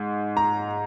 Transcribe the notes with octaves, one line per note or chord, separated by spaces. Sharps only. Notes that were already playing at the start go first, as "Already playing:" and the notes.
Already playing: G#2
A#5